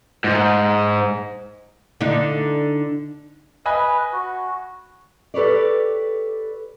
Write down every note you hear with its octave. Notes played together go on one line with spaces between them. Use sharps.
G#2
D3 D4 D#4
B4 D#5 G#5 B5
F#4
G4 A4 B4 C#5 D5